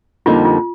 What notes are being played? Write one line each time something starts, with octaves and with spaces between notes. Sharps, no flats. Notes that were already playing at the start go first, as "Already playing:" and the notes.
F2 D3 G3 A#3 D#4 F4
F4